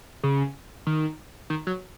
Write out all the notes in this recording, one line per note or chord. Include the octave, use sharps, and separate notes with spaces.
C#3
D#3
D#3
F#3